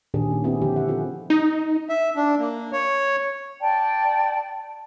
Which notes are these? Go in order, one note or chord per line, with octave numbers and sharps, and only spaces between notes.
A#2 D#3 D4 G4 G#4
C#4 D#4
B3 C4 E4 G4 G#4
D3 F3 B3 G4
G4 E5 F#5
C4 F4 G#4 A4
D#4
E5
D4
A#3
C#5
D5 G5 A5